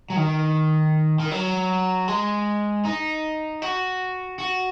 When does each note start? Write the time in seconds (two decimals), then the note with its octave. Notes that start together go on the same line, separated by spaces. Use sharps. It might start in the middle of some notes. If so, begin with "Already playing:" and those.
0.10 F#3
0.16 D#3
1.20 D#3
1.31 F#3
2.08 G#3
2.85 D#4
3.62 F#4
4.39 F#4